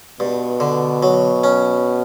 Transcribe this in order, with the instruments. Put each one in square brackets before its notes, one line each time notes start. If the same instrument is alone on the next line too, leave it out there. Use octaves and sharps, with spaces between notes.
[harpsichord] G2 [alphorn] B2
[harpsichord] D3
F#3
C#4